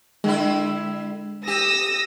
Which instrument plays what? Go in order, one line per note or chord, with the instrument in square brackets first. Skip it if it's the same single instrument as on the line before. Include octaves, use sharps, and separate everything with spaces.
[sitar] D3 E4 [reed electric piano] G#3
[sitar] G4 [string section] D#6 E6 A#6